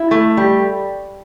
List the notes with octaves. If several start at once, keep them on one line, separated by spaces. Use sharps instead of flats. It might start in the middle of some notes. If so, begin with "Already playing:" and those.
Already playing: E4
A3
G3